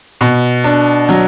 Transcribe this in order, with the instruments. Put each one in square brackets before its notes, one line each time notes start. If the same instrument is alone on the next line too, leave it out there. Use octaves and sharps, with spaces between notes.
[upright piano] B2
D4
F#3